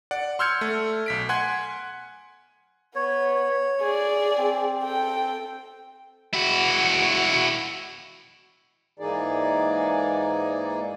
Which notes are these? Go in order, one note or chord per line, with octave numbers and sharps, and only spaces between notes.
D5 F#5
C6 E6 F6 G6 G#6 C#7
A3
B1 B6 D7
F#5 G#5 C6 F#6 G#6
B3 C#5
G#4 D5
C4
A4 G5
E4 F#4
G#2 E3 A#3 D#4 G#4 D5